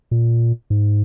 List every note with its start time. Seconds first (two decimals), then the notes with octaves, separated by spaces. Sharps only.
0.11 A#2
0.70 G#2